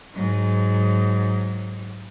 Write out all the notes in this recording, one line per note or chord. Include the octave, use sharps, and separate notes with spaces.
G#2 F#3